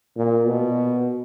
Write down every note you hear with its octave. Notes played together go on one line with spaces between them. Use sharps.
A#2
B2